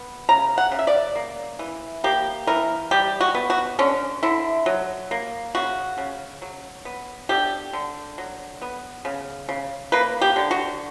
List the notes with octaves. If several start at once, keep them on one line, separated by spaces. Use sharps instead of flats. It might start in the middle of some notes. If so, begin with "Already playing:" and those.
Already playing: B3
C#3 A#5
F#5
C#3
E5
D5
A#3
E3
A#3 G4
E3 A#4
G3 G4
F#4
B3
F#4
D3 C#4
D3 E4
F#3
A#3
C#3 F#4
C#3
F#3
B3
D3 G4
D3
F#3
B3
C#3
C#3
A#3 B4
G4
D3
F#4